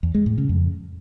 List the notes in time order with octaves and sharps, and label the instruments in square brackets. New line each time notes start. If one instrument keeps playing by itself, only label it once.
[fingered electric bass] E2
G#3
A2
C#3
F2